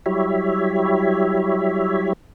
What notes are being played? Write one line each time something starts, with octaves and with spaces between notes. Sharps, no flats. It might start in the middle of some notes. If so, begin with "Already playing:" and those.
F#3 G3 E4 G4 C#5 E5